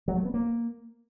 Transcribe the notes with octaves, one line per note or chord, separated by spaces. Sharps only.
F#3
A3
B3
A#3